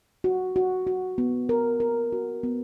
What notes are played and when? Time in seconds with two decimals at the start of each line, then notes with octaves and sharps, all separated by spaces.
0.24 F#4
0.56 F#4
0.87 F#4
1.18 B3
1.49 A#4
1.80 A#4
2.12 F#4
2.43 B3